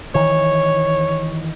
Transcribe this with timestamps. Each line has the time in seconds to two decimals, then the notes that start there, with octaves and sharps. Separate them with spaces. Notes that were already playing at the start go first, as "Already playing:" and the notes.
0.15 D#3 E3 C#5